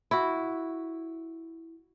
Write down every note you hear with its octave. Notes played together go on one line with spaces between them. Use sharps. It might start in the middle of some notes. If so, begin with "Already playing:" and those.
E4 F#4